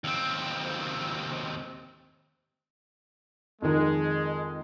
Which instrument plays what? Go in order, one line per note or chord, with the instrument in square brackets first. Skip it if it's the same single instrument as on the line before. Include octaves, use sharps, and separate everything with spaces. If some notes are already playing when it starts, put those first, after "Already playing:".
[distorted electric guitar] D#2 C4
[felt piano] F2 D#3 [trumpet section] G#3